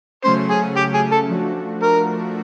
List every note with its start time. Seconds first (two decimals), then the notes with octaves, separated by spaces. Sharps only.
0.23 C#3 F#3 A3 C#4 C5
0.50 G#4
0.77 G4
0.94 G#4
1.12 A4
1.29 F3 A3 D4 F#4
1.83 A#4